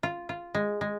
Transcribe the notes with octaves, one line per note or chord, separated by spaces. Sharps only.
F4
F4
G#3
G#3